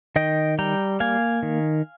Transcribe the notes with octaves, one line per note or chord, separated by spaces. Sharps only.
D#3 D#5 G5
G3 G5 A#5
A#3 F5 G#5
D#3